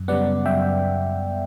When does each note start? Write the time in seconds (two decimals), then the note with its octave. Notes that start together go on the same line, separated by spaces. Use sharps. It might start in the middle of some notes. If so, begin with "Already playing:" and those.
Already playing: F#2
0.08 C#3 G3 B3 D5 F#5
0.46 F#2 E5 G5